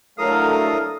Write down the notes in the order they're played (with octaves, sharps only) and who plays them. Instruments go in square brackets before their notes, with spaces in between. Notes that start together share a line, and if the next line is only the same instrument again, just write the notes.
[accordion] F#3 A3 [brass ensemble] D4 E4 A4 [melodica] A#4 D#6 [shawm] F5